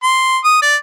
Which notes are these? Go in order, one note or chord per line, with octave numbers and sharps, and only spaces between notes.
C6
D#6
D5